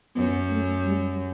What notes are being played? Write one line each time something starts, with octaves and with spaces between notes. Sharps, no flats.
F#2 B3
A3
G3